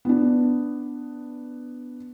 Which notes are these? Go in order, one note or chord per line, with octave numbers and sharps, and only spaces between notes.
B3 D4